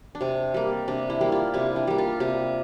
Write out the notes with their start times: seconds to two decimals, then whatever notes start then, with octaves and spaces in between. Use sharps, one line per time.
0.15 D4
0.21 C3 C4
0.54 G3 A#3
0.88 C3 D4
1.10 E4
1.21 G3 A#3
1.32 F4
1.54 C3 E4
1.76 D4
1.87 G3 A#3
1.98 F4
2.20 C3 G4